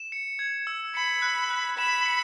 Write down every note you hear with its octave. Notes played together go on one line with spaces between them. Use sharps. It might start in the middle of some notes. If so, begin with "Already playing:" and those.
Already playing: E7
C#7
G#6
E6
B5 C#7
F#6
F#6
B5 E7
C#7